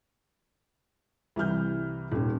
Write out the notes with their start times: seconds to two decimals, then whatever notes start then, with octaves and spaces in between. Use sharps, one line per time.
1.36 C2 E3 G3 F6 G6
2.12 D#1 G3 C#4